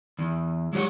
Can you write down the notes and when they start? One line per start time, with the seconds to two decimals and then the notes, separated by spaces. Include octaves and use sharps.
0.19 E2
0.73 F#3 G#3 G4 C#5 F#5